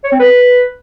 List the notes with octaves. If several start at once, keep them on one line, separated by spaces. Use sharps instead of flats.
C#5
C4
B4